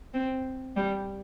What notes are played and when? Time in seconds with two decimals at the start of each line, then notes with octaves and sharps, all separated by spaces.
0.14 C4
0.76 G3